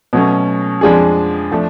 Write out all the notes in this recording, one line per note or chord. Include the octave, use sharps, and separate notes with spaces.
B2 F#3 A3 C#4
F2 F3 G#3 D4 G#4
F3 A3 D4